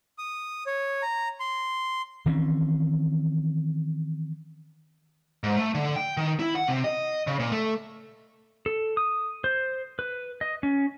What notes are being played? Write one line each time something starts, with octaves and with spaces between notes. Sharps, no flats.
D#6
C#5
A#5
C6
D#3 E3 C4 C#4
G#2
A3
D3
G5
D#3
E4
F#5
C3
D#5
C#3
A#2
A3
A4
D#6
C5
B4
D#5
C#4